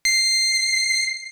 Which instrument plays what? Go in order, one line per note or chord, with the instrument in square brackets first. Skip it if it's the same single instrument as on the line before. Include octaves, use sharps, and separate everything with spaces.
[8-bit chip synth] C7